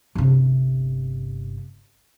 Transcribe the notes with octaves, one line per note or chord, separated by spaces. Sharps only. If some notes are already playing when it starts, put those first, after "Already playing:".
G1 C3